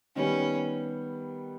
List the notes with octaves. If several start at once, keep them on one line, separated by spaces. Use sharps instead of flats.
D#3 G3 B3 C#4